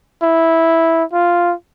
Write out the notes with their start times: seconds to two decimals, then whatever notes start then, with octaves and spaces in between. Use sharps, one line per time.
0.23 E4
1.13 F4